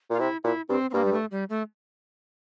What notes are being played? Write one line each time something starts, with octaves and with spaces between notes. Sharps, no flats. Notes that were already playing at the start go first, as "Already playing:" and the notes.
A#2 F4
C3 E4
A#2 E4
G2 C4
C4
G2 A#3
G3
A3
G3
A3